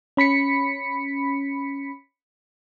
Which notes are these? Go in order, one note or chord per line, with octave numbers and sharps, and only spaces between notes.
C#4 B5 B6 C#7